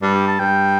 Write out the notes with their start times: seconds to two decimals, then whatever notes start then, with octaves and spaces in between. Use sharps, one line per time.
0.02 G2 D4
0.15 G4
0.28 A5
0.39 G2 G5